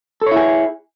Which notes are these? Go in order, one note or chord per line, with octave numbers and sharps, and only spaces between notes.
E4 G#4 A4 C#5